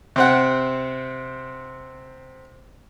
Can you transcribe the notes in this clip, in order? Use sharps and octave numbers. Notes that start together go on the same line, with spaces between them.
C3 C4 F#5